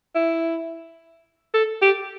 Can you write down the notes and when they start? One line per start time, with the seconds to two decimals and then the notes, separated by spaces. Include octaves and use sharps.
0.15 E4
1.54 A4
1.82 G4